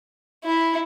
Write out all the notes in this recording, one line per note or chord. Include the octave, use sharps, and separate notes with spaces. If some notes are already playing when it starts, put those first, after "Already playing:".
E4